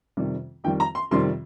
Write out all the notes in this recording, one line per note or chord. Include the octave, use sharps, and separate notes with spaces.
F2 C3 D#3 G3
F2 D#3 G3 G5
A#5
C6
F2 C3 D#3 G3 C6